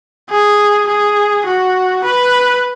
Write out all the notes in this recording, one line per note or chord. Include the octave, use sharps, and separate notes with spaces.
G#4
G#4
F#4
B4